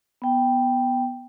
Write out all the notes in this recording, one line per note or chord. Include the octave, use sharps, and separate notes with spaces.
B3 G5